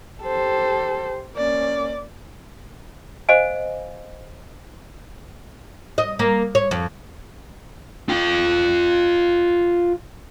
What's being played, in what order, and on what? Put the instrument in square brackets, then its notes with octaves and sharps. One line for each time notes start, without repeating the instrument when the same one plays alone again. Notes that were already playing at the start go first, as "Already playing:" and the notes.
[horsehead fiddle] G4 C5 [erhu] A4
[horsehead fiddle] A#3 C#4 [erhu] D5
[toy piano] C5 D#5 F5 G#5
[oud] D#5
A#3
C#5
F2
[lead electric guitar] F4 G5